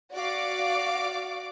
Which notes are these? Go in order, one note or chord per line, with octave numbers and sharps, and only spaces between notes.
F#4 D5 F5 D6